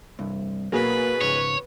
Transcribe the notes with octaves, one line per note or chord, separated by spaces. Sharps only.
C2 G2
B2 F#3 A#3 G#4 B4 B5
C#2 G#2 C#5